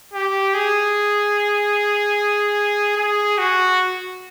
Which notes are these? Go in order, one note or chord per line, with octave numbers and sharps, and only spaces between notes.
G4
G#4
G#4
F#4